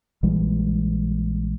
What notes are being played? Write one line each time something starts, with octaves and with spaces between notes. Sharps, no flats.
A#1 E3 G3 G#3